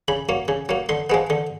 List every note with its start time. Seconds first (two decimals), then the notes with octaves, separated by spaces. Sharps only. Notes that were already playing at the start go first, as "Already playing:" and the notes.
0.08 C#3 B5
0.29 F#3 A#3
0.48 C#3
0.69 F#3 A#3
0.89 D3 C6
1.10 F3 G#3 B3
1.30 D3